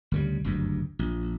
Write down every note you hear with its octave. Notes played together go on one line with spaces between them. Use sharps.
D2 C#3 G3
F#1 D2 G2
A#1